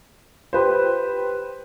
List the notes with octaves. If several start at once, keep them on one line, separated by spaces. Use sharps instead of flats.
G4 B4 C5